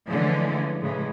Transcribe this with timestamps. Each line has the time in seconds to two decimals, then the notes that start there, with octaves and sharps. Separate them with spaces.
0.10 D3 E3 F3 G#3 A3 C#4
0.81 A2 C#3 E3 G#3